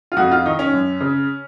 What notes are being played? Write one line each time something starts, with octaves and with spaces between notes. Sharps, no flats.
F4
F2 F#4
F4
D#3 D#4
C#4
F#2
C#3